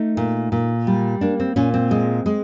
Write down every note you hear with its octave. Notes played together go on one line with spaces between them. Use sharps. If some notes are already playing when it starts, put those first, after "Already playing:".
Already playing: A3 D#4
A#2
A#2
G3
A#3 D4
C4
A#2 C#4
C4
G#3
G#3